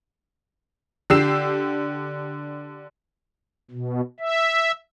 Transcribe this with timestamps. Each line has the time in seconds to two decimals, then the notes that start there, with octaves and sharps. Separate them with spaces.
1.10 D3 G4 E6 C7 E7
3.71 B2
4.19 E5